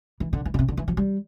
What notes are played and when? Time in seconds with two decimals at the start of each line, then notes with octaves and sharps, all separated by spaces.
0.20 E3
0.33 D3
0.45 E3
0.54 D3
0.59 C3
0.68 D3
0.77 E3
0.88 F3
0.97 G3